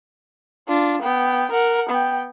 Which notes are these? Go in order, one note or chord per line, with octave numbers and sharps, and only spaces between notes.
D4 F4
B3 G5
A#4 F#5
B3 G5